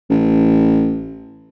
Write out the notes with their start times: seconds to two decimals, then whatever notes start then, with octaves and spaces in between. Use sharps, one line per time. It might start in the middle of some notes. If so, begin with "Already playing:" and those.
0.10 A1